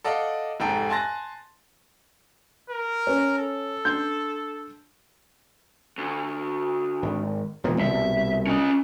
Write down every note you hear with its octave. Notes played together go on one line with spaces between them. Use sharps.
A4 D5 D#5 F5 F#5
F1 G#2 A4 G5
G#5 A5 C6 F#6 A6 A#6
A#4
C#4
A4
D4 C6 G6
D2
G#1
E1 A#2 D#3
C2 B2 E5
C#4 D#5